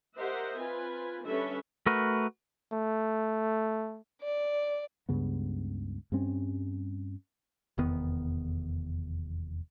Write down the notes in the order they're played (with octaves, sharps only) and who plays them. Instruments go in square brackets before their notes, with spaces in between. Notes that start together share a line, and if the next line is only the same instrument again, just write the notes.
[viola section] G4 A#4 C5 D#5 E5 F#5
C4 F4 B4 G#5
D3 G3 C#4 A4 B4 E5
[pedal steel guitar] A3 F#4 A#4 B4
[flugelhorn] A3
[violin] D5
[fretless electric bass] C#2 G2 C#3 B3
G2 G3 C4 C#4
[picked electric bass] F1 E2 D#3 B3